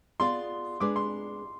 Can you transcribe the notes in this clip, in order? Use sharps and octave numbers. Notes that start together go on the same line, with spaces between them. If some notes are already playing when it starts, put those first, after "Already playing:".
B3 F4 G#4 D5 F5 C6
G#3 D4 G#4 B4 D6
C6